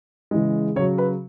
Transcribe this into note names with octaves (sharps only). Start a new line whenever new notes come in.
C#3 E3 G#3
C#3 F#3 C#5
B4